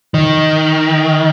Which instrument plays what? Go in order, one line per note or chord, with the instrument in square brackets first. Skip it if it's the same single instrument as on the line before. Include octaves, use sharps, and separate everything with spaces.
[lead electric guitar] D#3